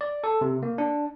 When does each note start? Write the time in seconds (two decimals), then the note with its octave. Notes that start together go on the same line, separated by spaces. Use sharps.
0.01 D5
0.24 A4
0.41 C3
0.63 A#3
0.78 D4